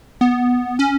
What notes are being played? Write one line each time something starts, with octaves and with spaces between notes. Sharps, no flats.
B3
C#4